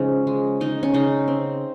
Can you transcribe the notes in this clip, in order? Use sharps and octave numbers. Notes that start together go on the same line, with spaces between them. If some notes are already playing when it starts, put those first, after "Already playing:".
Already playing: C#3 F3 G#3 C#4 D#4
G#3
C#3 D#4
C#4
C#3 D#4
C4